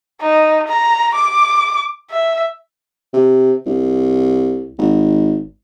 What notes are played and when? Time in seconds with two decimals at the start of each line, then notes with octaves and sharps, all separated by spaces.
0.21 D#4
0.68 A#5
1.15 D6
2.10 E5
3.13 C3
3.66 C2
4.78 G#1